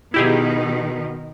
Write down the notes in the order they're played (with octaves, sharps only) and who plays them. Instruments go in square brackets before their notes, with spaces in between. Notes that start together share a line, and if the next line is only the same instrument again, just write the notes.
[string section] B2 D#3 [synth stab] E4 G4 G#4